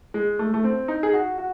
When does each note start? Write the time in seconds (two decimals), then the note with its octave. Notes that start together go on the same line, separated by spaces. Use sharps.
0.14 G#3
0.39 A3
0.54 A3
0.64 C4
0.88 D#4
1.03 G#4
1.13 F#4
1.38 F#4